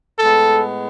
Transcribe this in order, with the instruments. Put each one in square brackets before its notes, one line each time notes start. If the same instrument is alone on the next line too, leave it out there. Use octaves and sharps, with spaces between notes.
[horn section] A2 G#3 B3 A4